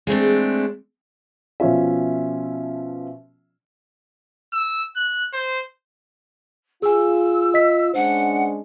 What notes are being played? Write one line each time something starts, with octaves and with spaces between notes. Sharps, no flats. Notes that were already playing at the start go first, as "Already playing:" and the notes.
G#3 A3 C4 D4
B2 F3 C#4 F4 E5
E6
F#6
C5
F4 G#4 G#5 E6
D#5 B6
G#3 C#4 D4 C5 F#5